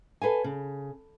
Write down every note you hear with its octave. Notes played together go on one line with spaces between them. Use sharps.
A4 B4 F5 G#5
C#3